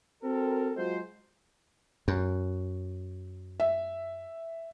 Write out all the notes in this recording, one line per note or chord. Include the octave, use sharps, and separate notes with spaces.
C4 F#4 A4 A#4
F#3 G#3 F4 F#4 C5
F#2
E5